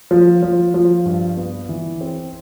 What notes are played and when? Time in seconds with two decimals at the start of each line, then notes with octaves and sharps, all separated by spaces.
0.11 F3
0.43 F3
0.74 F3
1.06 G2
1.37 B3
1.69 E3
2.01 C4